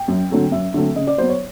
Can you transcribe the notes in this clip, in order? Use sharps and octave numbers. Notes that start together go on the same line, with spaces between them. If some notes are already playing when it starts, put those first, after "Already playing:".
Already playing: G5
F#2
D3 F#3 A3 C4
F#2 E5
D3 F#3 A3 C4
C#3 D#5
D5
F#3 B3 C5
C#5